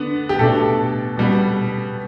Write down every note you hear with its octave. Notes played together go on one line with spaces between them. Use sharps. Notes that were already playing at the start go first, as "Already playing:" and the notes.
Already playing: D3 B3 D4
G4
B2 A3 D4 A4
B2 G3 B3